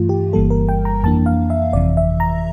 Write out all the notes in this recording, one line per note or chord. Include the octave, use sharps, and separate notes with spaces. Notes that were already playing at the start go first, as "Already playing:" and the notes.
Already playing: G2 E3 A3 F4
G4
G1 G2 E3 G3 A#3 A4
A#4
G5
A#5
F2 E3 A#3 D4 A5
F5
E5
G1 F2 C3 E3 D5
E5
A#5